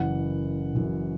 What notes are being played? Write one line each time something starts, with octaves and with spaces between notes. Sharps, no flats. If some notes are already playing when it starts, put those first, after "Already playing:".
Already playing: F#1 F#2 E3 F#5
F#1 F#2 E3